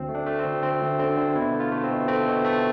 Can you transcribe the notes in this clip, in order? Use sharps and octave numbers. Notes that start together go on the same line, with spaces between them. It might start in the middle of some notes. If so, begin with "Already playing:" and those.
Already playing: D2 C4
A3
D4
A3
C4
D2
D3 C4
D2
D3 C4
D3
B2 E4
A3
F4
A3
C4
B2
A3 C4
B2
A3